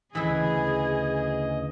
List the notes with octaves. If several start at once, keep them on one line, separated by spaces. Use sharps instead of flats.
D2 C#3 E3 E4 G#4 D#5